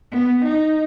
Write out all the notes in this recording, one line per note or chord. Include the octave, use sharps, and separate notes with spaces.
B3
D#4